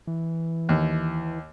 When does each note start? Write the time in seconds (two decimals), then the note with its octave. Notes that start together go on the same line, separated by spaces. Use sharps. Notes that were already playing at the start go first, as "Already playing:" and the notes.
0.07 E3
0.69 D#2